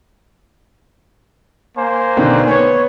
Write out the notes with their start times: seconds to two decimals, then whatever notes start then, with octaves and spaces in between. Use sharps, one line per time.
1.77 A#3 C5 G#5
2.17 B2 D3 D#3
2.48 B3 C#5